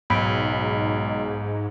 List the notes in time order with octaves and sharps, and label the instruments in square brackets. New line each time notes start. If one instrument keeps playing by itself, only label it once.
[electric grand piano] B1 [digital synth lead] G#2 [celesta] B5 B6 D7